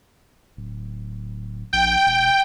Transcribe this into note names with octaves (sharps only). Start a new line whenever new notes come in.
D1
A#1 G5
E1